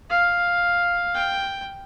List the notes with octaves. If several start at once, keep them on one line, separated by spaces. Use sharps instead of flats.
F5
G5